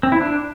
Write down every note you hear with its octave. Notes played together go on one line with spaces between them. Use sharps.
C4
E4
D4